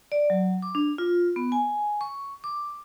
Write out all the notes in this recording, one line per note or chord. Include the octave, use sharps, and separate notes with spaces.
D5
F#3
D6
D4
F4
B3
G#5
C#6
D6